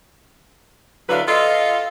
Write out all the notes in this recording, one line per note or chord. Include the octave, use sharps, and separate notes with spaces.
D3 F#3 D4 E4 B4 F5
F4 A4 D#5